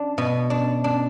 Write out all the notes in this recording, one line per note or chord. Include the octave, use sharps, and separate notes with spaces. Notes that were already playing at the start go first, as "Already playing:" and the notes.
Already playing: D4
B2
D4
D4